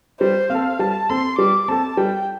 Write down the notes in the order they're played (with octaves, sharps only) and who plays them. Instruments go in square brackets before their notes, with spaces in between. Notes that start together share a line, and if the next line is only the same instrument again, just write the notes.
[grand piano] G3 [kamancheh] C5
[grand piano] C4 A4 [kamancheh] F5
[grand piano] G3 [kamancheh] A5
[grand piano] C4 A4 [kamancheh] C6
[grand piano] G3 [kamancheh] D6
[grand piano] C4 A4 [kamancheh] A5
[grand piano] G3 [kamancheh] G5